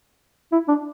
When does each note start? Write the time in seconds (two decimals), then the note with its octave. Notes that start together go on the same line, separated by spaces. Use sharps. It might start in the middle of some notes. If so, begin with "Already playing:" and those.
0.52 E4
0.68 D4